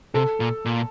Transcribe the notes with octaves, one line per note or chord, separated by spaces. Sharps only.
C3 A4
A#2
A#2